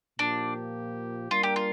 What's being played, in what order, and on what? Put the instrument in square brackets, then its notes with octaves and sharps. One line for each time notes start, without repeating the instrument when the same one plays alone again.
[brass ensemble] A#2 F3 A#3 G4 [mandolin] D4
[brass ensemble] G3 A#3 D4 A#4 [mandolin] F4
[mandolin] G4
F4